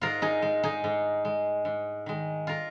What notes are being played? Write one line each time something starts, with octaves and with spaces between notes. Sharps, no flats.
G#2 F4 A#4
D#4 G#4
G#3
D#4 G#4
G#2
G#3
G#2
D#3 G#3
F4 A#4